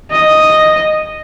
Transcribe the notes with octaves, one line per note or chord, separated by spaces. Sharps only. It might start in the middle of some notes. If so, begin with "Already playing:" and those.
D#5